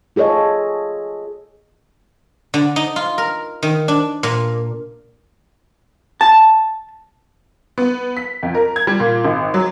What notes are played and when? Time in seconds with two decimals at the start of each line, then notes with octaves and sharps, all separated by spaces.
0.16 F4 G#4 A4 C#5 D#5
2.54 D3
2.76 D#4
2.96 F4
3.18 A#4
3.63 D#3
3.88 D4
4.23 A#2
6.21 A5
7.78 B3
8.17 B6
8.43 F2
8.55 A#4
8.76 G#6
8.87 G3
9.00 A#2
9.25 G#1
9.54 F#3